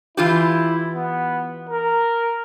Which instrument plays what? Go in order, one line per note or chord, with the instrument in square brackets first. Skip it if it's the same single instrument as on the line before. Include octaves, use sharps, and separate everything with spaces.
[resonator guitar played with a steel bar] E3 F4 G4 [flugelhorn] E4
[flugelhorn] B3
A#4